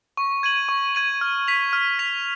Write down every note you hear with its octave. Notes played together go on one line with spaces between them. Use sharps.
C#6
G#6 D#7 F#7
C#6
G#6 D#7 F#7
F6
B6 F7
F6
B6 F7